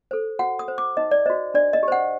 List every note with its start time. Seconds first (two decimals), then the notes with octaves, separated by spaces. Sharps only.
0.11 A4 C5
0.39 F#4 F#5
0.59 D#6
0.68 C5
0.78 D6
0.97 D#4 D#5
1.11 D5
1.26 F#4 C5 D#5
1.54 D4 D5
1.73 D#5
1.83 G4
1.88 C5 F#5